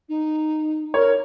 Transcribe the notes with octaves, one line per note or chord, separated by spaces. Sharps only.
D#4
A#4 C#5